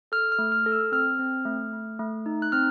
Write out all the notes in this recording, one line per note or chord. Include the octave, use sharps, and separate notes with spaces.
A4 F6
F6
A3
F6
A4
E6
C4 F6
C4
A3
A3
A3
D#4
F#6
C4 F6